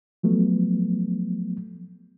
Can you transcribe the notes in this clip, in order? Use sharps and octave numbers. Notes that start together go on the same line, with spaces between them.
F3 F#3 A3 B3